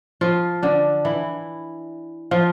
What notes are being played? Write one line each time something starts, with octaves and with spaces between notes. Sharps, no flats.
F3 F4
D3 D4
E3 E4
F3 F4